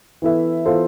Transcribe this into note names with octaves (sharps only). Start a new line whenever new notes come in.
E3 B3 E4 A4 E5
E3 B3 F4 A4 C5